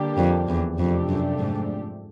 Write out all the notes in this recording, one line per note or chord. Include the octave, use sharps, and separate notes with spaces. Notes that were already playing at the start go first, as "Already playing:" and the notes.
Already playing: D3 G3 A#3 D4 G4
F2
E2
F2 C3 F3 A3 D4 G4
F#2
G#2